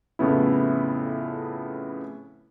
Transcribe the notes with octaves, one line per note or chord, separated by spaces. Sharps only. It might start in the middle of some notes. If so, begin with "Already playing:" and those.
F2 A2 C#3 B3 E4